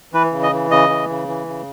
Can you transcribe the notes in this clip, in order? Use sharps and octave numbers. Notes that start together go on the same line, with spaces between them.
E3 B4
C#3
D#5
E3
C#3 D#5
E3
C#3
E3
C#3